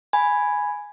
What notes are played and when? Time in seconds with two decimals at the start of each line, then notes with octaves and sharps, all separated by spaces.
0.13 G#5 B5